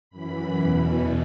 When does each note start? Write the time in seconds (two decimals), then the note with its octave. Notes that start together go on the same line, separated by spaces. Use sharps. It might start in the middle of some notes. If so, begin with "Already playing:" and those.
0.10 F#2 E3 B5
0.57 E2 B2